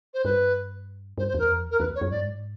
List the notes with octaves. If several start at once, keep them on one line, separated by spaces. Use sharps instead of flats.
C5
G2 B4
G2 C5
C5
E2 A#4
F2
E2
A#4
E2 B4
C#5
F#2
G#2 D5
G2
G#2